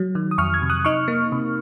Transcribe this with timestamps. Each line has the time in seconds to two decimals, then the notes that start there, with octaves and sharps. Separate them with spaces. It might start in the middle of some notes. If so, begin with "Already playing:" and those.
Already playing: F#3
0.15 D#3
0.31 D#6
0.38 F2 C#6 F6
0.54 F6 G#6
0.62 C3
0.70 D#6 F#6
0.85 D#4 C#6 F6
1.08 A#3
1.32 C3